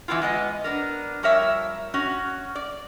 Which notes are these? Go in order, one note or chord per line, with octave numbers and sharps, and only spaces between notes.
E3 A3 B3 E4 F4
G#3 B3 D#5
B3 D4 A#4
F3 G3 A#4 C#5 E5
C#4 F#4
D5